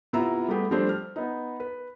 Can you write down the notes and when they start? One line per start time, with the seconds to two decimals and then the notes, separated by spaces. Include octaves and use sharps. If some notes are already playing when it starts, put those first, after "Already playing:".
0.13 C3 B3 E4 F4 A#5 E6
0.48 G3 A3 B3 G4 G#4
0.71 F3 G3 A3 C4 D4 C5
0.89 F6
1.16 B3 D#4
1.60 B4